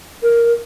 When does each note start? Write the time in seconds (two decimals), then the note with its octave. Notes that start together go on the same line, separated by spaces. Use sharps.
0.23 A#4